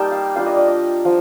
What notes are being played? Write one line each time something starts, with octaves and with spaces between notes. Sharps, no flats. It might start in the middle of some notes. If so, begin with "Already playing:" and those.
Already playing: G3 A#3 D#4 G5 A5
F5
G3 D4 F4 F5
D#5
D5
D#5
F3